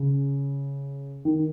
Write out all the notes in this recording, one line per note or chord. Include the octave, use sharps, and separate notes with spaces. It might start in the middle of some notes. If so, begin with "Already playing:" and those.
Already playing: C#3
D#3